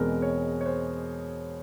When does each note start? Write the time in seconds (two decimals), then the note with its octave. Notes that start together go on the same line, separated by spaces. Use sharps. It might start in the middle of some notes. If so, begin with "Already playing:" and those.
Already playing: E2 B2 G#3 C4 A#4
0.22 C#5
0.61 C#5
0.66 C5